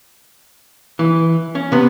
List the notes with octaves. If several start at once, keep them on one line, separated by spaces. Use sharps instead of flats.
E3
C#4
C3 B3